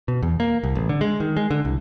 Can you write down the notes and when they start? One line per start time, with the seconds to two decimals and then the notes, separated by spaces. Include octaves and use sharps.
0.08 B2
0.22 E2
0.40 A#3
0.63 C2
0.75 A1
0.89 D3
1.01 G#3
1.20 D#3
1.37 G#3
1.51 D3
1.65 C2